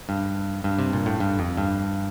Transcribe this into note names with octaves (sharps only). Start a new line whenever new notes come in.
G2
G2
C3
A#2
A2
G2
F2
G2